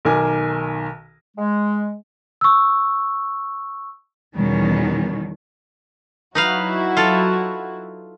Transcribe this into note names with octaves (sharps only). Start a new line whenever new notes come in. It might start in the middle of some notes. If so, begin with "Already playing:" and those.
B1 D#3 A#4 G#5 D6
G#3
C#6 E6
E2 B2 D#3 G3 C#4
F#3 D#4 E4 F#4 B4 F5
F4 A4